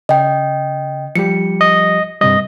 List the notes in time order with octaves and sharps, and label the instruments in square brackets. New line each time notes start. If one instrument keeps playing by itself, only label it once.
[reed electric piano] C#3 [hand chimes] D#5 G5
[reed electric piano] F3 G3 G4 [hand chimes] C#7
[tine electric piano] D#5
[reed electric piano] G2 C3 G3 [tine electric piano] D#5